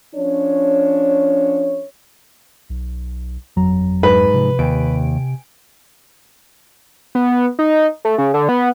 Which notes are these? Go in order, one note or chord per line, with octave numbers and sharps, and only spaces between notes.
F3 C#4 D4 C#5
B1
G1 F2 F#3 A#5
G#2 B4
C3 F3
D#2 G5 G#5 D7
B3
D#4
A3
C#3
D3
B3